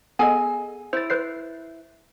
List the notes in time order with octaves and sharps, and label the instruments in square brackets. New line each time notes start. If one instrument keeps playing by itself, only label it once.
[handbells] B3 A4 D#5 [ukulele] G#4 G#5
[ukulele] E4 [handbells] C5 A6
[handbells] B4 C5 C7